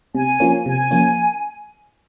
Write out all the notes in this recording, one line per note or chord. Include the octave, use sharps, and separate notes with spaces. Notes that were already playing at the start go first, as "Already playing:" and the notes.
C3 G#5
F3 A#3 C#4
C3 G#5
F3 A#3 C#4